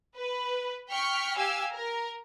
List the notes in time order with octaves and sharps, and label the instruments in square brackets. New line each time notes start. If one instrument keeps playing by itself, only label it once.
[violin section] B4
G5 C#6 F6 B6
G4 F5 G#5 E6
A#4